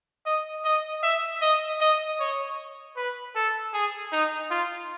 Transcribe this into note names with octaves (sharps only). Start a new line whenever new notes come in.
D#5
D#5
E5
D#5
D#5
C#5
B4
A4
G#4
D#4
F4